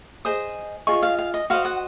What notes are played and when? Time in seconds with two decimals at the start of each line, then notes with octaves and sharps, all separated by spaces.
0.25 G#4 C5 D#5 D#6
0.87 F4 G#4 D#5 C#6
1.03 F5
1.19 F5
1.34 D#5
1.50 F#4 C5 D#5 F5
1.65 F#5